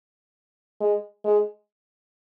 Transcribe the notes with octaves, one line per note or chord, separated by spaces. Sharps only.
G#3
G#3